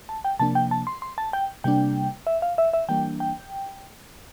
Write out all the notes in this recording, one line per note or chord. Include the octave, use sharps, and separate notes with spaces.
A5
G5
C3 F3 A#3 D4 A5
G5
A5
C6
C6
A5
G5
C3 G3 A#3 D4 G5
E5
F5
E5
E5
E3 G3 A#3 D4 G5
G5